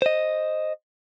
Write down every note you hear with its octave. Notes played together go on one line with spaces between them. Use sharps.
C5 D#5